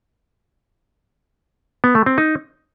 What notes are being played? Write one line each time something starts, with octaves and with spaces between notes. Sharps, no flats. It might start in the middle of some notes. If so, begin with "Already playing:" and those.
B3
A3
C4
D#4